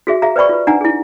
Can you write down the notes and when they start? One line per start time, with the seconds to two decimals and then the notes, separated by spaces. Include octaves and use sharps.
0.07 F#4 G#4 E5
0.22 G#4 E5 F5 A#5
0.36 B4 C5 D5 G5 B5 C#6
0.49 F4 B4
0.67 D4 D#4 F#5 G#5 A#5
0.81 E4 G#4